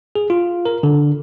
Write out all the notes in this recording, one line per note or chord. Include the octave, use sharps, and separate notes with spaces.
G#4
F4
A#4
D3